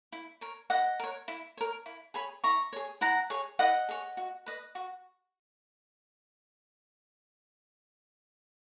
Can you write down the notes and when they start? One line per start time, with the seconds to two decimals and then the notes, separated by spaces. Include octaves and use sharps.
0.12 E4
0.41 A#4 C#5
0.70 E4 D#5 F#5
1.00 A#4 C#5
1.28 E4
1.57 A#4 C#5
1.86 E4
2.14 G#4 C#5 G#5 B5
2.44 E4 A#5 C#6
2.73 G#4 C#5
3.01 E4 F#5 A#5
3.30 G#4 C#5
3.59 E4 D#5 F#5
3.89 G#4 C#5
4.17 F#4
4.46 B4 D#5
4.75 F#4